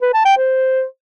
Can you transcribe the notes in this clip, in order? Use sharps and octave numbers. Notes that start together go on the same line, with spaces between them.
B4
A5
G5
C5